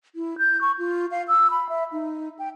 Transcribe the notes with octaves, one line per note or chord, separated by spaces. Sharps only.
E4
G6
C#6
F4
F5
E6
B5
E5
D#4
G5